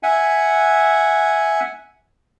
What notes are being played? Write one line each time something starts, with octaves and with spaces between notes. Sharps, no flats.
E5 F#5 G#5